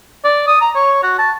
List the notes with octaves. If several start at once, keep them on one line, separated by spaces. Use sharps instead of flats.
D5
D#6
A#5
C#5
F#4
A5